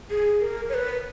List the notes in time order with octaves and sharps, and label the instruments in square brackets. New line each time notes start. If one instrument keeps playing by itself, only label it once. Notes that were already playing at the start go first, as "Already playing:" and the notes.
[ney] G#4
A#4
C#5
B4